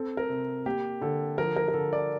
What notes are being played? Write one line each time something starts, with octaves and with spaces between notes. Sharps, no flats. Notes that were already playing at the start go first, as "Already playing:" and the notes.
Already playing: C4 A4
A#4
C3
A#3 G4
D3 A4
F3 A#4
A#4
A#4
D3 A4
D5